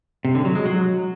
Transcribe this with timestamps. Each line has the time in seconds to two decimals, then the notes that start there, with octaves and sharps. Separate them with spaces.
0.25 C3
0.35 D3
0.45 F#3
0.55 G#3
0.66 F#3